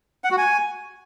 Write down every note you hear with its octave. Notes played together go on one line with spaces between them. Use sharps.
F#5
F#4
G#5